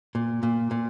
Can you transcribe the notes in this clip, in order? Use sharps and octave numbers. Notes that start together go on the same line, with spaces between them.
A#2
A#2
A#2